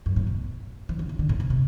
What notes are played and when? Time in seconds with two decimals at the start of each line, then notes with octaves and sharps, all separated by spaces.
0.06 F#2
0.16 A2
0.27 B2
0.89 E3
0.99 D3
1.09 E3
1.19 D3
1.29 A2
1.40 B2
1.50 C3